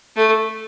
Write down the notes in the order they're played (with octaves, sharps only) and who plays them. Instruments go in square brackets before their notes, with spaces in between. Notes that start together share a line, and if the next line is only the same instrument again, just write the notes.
[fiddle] A3